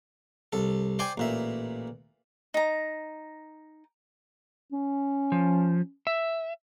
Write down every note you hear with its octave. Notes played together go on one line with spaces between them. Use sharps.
C2 A4
C5 D5 G5 G#5
A1 A#2 E5
D#4 A#5
C#4
F3
E5